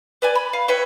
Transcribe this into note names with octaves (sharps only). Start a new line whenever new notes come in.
B4 D5 G#5
B5
F5
B4 C#5 E5 G5